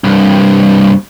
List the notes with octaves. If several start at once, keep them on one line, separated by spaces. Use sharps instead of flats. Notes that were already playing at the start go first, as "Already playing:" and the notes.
C2 G2